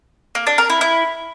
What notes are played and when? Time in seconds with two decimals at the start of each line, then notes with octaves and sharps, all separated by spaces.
0.35 A#3
0.47 D4
0.58 A#4
0.70 E4
0.81 E4